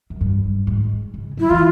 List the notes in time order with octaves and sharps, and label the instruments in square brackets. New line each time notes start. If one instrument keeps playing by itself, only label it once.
[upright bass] F#2
G2
G#2
C#3
[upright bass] F#3 [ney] E4
[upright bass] E3 [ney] F4